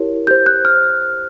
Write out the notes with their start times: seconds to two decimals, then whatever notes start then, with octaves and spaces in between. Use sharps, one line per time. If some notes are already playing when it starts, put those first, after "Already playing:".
Already playing: E4 G4 A#4 C#5
0.27 G4 C5 G6
0.46 F#6
0.65 F6